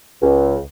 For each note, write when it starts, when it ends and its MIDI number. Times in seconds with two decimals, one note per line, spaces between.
0.22 0.57 37